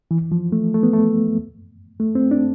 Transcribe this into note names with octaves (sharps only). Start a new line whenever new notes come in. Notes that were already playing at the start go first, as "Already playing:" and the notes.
E3
F3
A3
A3
B3
A3
A3
C4
D4